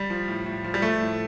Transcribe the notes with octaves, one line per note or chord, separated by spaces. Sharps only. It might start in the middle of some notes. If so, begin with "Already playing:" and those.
Already playing: G3
F3
A2
A2
F3
G3
F3 A3
A2